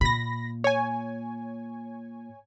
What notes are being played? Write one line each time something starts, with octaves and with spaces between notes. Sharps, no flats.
A#2 B5 A#6
C#5 G#5